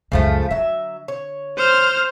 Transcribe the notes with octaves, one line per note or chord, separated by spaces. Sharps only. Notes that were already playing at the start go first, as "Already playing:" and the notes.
C#2 F#2 C#3 F3 A3
D3 F#3 E5
C#5
C5 F6